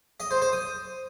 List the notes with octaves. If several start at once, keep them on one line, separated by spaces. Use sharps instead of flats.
D#5
C5
C5
D#6